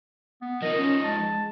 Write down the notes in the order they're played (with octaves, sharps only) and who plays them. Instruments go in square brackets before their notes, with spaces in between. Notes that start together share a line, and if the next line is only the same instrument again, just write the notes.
[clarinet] B3
[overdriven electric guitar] F3 D#4 [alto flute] A#4 [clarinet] D#5
[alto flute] C#4
[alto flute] G#3 [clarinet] A5